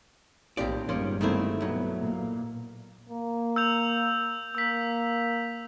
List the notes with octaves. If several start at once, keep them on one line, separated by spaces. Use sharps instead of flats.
A#1 D#2 A2 C4 F4 G4 D5
G1 F3 G#3 A#3 C#4
D#3 G3 A3 A#3 C4 E4
B1 F#3 B3
A#2 A#3
A#3
E6 G6 F7
A#3 E6 B6